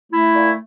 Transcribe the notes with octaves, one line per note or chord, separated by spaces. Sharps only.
A3 E4
A#2